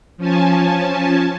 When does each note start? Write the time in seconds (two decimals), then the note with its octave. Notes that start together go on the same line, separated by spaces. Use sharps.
0.17 F3 C#4 G#5 A5